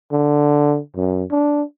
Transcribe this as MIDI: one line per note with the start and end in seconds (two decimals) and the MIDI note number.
0.11 0.79 50
0.96 1.24 42
1.31 1.62 62